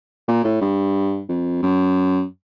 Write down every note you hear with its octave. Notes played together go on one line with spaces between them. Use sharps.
A#2
A2
G2
F2
F#2